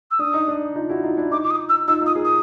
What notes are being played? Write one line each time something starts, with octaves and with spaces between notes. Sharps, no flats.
E6
D4 D#6
D#4
D4
D#4 F4
E4 F#4
D#4 F4
D4 E4
D#4 F4 D6
D6
D#6
E6
D#4 F4 E6
D#4 F4 D#6
G#4 A#4
D#6